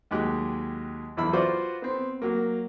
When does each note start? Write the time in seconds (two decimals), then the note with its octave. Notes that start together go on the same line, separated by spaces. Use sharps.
0.11 D#2 F#3 G#3 G4 F#6
1.17 B1 E2 E3 E4 B5 E6
1.33 F4 F#4 B4 C5 D5
1.82 B3 C4
2.22 F#3 A#3